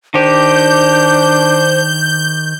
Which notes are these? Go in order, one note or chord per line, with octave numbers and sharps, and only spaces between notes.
D#3 D4 G4 C5 G6